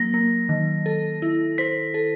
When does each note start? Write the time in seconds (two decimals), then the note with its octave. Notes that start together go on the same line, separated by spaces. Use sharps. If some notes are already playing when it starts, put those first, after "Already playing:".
Already playing: F#3 A#3 A#6
0.14 A#3
0.49 D#3
0.86 A4
1.22 E4
1.58 C5 B6
1.94 A4